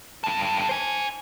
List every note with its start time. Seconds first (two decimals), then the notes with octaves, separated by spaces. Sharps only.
0.24 G2 A4
0.69 C5 G#5